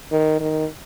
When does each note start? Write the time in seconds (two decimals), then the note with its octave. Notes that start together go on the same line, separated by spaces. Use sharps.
0.12 D#3
0.40 D#3